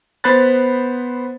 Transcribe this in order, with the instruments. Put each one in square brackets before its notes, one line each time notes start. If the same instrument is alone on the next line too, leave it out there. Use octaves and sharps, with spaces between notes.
[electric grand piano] B3 C5 B5 F#6 A6